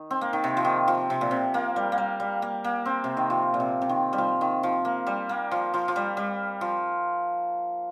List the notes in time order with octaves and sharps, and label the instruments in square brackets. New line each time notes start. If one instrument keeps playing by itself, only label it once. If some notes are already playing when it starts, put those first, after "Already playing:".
Already playing: [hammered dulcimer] D#3
C4
A#3
D#3
C3
F3
D#3
F3
C3
A#2
C3
A#3
G3
A#3
G3
G3
A#3
A#3
C4
C3
D#3
F3
A#2
C3
C3
D#3
G3
F3
D#3
F3
A#3
G3
A#3
F3
F3
F3
G3
G3
F3